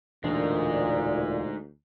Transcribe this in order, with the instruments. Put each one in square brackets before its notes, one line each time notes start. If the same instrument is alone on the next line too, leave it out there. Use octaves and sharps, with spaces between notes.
[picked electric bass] E1 E3 D4 [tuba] D2 [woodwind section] A#2 [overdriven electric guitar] G#3 D#4